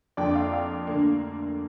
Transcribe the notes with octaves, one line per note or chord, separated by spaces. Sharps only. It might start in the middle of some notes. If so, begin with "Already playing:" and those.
F2 D3 A#3 D4 D5 G5
F5
F5
D2 D3 A#3 D4